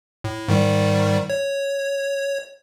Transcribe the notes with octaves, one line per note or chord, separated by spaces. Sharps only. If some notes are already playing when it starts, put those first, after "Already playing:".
A2
G#2 D#3 G3
C#5